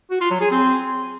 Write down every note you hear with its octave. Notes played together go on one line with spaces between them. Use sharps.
F#4
F4
F#3
G#4
C4